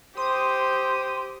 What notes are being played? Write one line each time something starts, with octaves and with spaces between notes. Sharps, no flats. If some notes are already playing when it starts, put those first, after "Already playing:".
G4 C5 C6 D#6